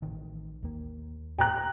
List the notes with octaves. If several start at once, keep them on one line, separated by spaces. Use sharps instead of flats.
A1 D#3
D#2 A#3
A2 G5 A#5 F#6